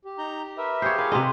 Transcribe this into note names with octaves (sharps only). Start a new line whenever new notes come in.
G4
D#4 A#5 G6
A#4 B4 E5
F4 G4 G#4 C5 C#5
A#4 B4 F5
C3 G#3 C4 D#5